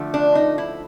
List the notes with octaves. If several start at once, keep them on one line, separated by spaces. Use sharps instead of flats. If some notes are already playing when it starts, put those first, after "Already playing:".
Already playing: D3 F3 A3
D4
D#4
E4